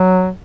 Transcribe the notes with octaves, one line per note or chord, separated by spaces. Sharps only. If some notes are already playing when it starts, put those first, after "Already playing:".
Already playing: F#3